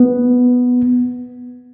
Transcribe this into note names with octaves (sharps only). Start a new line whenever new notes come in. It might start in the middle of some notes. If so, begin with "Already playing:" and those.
Already playing: B3